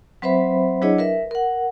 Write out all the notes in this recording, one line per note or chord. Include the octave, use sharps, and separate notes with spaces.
F#3 C4 B4 C5 E5 B5
F#3 D4 E4 G#4 C#5 D#5
A#4 B4 E5
A#4 F#5